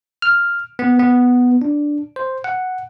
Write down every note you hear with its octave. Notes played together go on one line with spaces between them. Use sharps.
F6
B3
B3
D4
C5
F#5